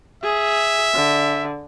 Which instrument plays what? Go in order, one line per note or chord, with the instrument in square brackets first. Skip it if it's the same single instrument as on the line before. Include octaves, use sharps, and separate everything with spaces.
[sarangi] G#4 [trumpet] E5
[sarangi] D3